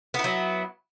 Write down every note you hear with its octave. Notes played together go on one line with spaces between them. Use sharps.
F#3 B3 E4